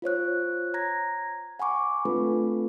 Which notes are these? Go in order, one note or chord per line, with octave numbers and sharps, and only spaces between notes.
F4 C5 C#5 F#6
A#5 G#6 A#6
F#5 G#5 B5 C#6 D6
A3 C4 D4 F4 A4 B4